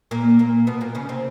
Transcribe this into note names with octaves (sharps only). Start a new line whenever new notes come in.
A#2 A#3
A#2 A#3
B2 B3
A#2 A#3
C#3 C#4
C3 C4